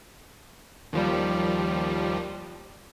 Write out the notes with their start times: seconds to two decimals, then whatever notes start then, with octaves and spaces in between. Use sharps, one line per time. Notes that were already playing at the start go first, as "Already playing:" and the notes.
0.93 D#2 F3 G3